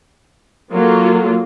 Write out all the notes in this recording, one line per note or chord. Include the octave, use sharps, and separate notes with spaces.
F#3 A#3 F4 A4